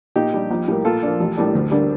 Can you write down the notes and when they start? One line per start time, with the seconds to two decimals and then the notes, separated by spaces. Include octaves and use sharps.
0.16 A#2 D#4 G4
0.34 G3 D4
0.50 A#1
0.68 A2 G3 A#3
0.85 A#2 F4 A4
1.03 F3 A#3 D4
1.20 A1
1.37 A2 G3 A#3 D4
1.55 D2
1.71 D3 G3 A#3 D4